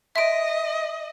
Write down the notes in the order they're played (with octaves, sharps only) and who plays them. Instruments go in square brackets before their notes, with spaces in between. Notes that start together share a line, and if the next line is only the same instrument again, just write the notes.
[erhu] D#5 [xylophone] E5 D7